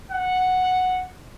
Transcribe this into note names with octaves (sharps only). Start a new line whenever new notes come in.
F#5